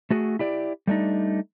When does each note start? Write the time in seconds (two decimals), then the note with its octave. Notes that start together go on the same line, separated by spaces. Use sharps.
0.10 A3 F#4 G#4
0.39 E4 G4 D5
0.87 G3 A3 D4 D#4